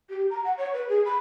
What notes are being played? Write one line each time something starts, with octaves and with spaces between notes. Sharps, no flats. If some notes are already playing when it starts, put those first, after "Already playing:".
G4
A#5
F#5
C#5
B4
G#4
B5